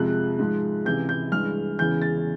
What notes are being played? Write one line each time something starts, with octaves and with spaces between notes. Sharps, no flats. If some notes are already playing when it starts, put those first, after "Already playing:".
Already playing: F2 C3 F3 G#3 F#6
G#2 F3 G#3
C#2 C3 E3 G6
G6
G2 E3 G#3 F6
E2 C#3 E3 G6
A6